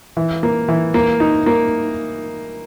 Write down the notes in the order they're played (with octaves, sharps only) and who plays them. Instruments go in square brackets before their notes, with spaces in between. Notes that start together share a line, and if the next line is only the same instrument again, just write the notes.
[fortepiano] E3
A#3
E3
A#3
D#4
A#3